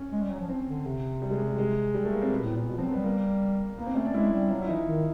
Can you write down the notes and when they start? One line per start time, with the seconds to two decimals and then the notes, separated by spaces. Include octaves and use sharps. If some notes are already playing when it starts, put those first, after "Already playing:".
Already playing: C#4
0.12 G#3
0.21 G3
0.31 F#3
0.40 F3
0.49 C4
0.67 D3
0.85 C3
1.22 G3
1.31 G#3
1.39 G3
1.58 G#3
1.94 G3
2.04 A3
2.13 A#3
2.22 C4
2.31 B2 B3
2.43 A2
2.55 A#2
2.68 B2
2.77 F3 C4
2.86 F#3
2.91 G3 B3
3.04 A#3
3.78 A#3 B3
3.86 C4
3.96 A3 C#4
4.05 D4
4.14 G#3 E4
4.32 G3
4.50 F#3 F4
4.62 E4
4.68 E3 D#4
4.87 D#3